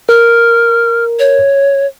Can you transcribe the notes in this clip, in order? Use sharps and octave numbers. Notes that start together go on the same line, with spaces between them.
A#4 F6
C#5